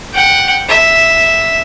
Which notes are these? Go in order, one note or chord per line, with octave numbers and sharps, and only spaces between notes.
F#5 G5
E5